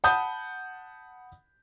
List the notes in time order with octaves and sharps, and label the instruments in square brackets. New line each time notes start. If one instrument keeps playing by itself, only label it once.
[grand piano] F#5 A5 B5 D#6 G6